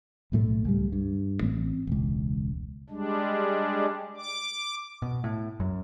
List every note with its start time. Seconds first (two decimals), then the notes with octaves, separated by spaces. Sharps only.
0.32 B1 A2 E3 A3
0.65 C#2 A2 G3
0.92 G2
1.41 A1 C4
1.87 E1 C#2
2.90 G3 G#3 D4
4.17 D6
5.02 B2
5.24 A2
5.60 F#2